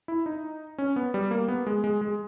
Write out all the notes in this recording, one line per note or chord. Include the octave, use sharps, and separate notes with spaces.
E4
D#4
C#4
B3
G3
A#3
B3
G#3
G#3
G#3